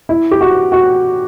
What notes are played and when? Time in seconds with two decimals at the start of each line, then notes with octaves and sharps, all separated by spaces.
0.09 E4
0.31 G4
0.41 F#4
0.72 F#4